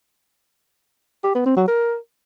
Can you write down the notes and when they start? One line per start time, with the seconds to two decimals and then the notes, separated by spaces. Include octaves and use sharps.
1.24 G4
1.35 B3
1.46 C4
1.56 F#3
1.67 A#4